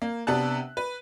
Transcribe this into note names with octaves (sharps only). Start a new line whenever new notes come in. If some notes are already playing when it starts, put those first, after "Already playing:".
A#3
C3 B3 D4 A5 F#6
B4